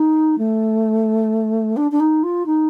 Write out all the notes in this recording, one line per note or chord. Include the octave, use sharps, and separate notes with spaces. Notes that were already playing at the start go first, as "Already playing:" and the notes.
Already playing: D#4
A3
D4
D4
D#4
F4
D#4